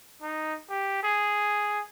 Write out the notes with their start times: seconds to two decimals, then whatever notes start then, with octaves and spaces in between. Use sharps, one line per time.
0.22 D#4
0.70 G4
1.03 G#4